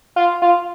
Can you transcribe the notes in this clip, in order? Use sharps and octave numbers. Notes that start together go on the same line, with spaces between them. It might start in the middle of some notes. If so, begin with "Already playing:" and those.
F4
F4